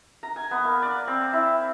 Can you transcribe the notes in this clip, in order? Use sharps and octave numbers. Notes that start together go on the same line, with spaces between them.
A#5
G#5
B3
A#3
D5
C4
E4